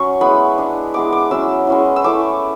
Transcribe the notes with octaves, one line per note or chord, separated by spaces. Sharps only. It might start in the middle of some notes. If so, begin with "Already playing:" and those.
Already playing: F#3 C#4 C#6
G#3 B3 E4 B5
G#3 D4
G#3 B3 E4 D6
D6
F#3 C#4 E4 E6
G#3 C#4 E4
E6
A3 C#4 E4 D6